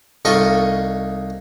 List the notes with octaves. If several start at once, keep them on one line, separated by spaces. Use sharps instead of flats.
C2 D#4 F4 A4 D#5 C#6